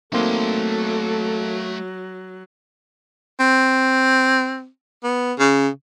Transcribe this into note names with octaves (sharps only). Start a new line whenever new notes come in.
F#3 A3 A#3 C4 D#4 A4 C6
C4
B3
C#3